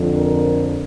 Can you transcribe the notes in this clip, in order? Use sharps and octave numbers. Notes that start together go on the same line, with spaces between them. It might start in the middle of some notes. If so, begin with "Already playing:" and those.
Already playing: F2 D3 F3
A#4